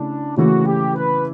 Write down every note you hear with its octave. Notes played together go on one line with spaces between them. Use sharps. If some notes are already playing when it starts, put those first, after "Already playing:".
Already playing: C#3 A3 D4 E4
C#3 E3 A3 E4 F#4
G4
B4